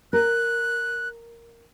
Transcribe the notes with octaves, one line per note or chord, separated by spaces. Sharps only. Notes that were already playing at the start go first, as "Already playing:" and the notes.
A#4 F#6